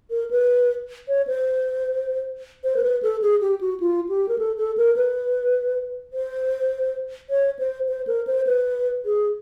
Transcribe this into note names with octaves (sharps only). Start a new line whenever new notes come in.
A#4
B4
C#5
C5
C5
A#4
B4
A4
G#4
G4
F#4
F4
G4
A#4
A4
A4
A#4
B4
C5
C#5
C5
C5
A#4
C5
B4
G#4